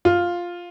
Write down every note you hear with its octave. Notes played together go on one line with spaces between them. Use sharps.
F4